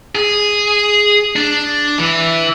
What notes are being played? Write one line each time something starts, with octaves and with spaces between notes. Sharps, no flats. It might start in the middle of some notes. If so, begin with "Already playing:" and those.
G#4
D4
E3